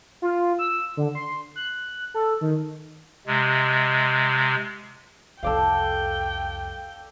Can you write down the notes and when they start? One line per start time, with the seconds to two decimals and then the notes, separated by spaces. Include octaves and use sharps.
0.22 F4
0.59 E6
0.97 D3
1.15 C6
1.56 F#6
2.14 A4
2.41 D#3
3.27 C3 G#3
5.43 C2 F2 A4 D5 F5 G5